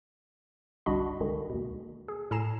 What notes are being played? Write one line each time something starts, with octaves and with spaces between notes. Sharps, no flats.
G1 C2 D4 F#4 D#5 B5
C#2 D3 D#3 G#3
D#2 B2
G#4
A2 A4 G#5 A#5 C7 E7